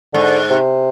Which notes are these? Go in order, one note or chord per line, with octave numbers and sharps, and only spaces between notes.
G#2 D3
C3